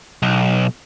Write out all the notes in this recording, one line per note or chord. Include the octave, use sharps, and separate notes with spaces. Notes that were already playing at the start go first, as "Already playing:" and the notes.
B1